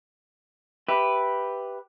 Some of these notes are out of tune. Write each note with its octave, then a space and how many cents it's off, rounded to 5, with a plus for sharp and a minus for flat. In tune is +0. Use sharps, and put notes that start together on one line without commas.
G4 +0 B4 +0 E5 +0